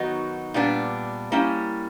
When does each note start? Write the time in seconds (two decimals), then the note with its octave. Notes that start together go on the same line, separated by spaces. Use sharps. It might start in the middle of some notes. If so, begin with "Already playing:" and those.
Already playing: D#3 F#3 B3 D#4 F#4
0.54 A#2 G3 B3 D4
1.32 G3 A#3 C#4 E4